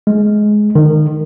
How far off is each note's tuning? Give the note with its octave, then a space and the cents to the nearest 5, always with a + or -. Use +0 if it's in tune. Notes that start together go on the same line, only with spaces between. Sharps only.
G#3 +15
D#3 -25